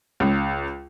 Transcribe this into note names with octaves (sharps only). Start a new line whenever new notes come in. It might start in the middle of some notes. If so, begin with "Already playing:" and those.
C#2